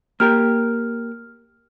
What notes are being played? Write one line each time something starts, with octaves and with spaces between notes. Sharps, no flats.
A#3 G4 A#4 F6